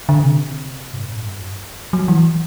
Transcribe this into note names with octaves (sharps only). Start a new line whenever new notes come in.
D3
C3
G2
A2
G2
F#2
G2
F#3
E3